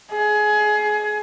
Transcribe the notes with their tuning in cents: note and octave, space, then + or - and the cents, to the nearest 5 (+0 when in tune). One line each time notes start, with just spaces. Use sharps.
G#4 +25